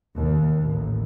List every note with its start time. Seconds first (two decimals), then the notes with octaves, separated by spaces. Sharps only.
0.16 D#2
0.62 A1